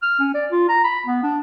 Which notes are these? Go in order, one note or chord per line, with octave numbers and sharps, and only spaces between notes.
F6
C#4
D5
F4
A#5
B5
B3
D4